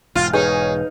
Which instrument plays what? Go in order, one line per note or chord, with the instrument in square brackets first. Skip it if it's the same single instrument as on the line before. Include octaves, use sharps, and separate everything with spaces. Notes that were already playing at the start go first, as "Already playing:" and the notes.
[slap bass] E1 G#2 [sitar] F4
[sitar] D#4 [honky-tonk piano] G#4 C#5 [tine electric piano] B4 G6